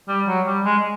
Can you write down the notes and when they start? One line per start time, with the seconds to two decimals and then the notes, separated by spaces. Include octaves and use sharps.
0.08 G3
0.27 F#3
0.46 G3
0.64 G#3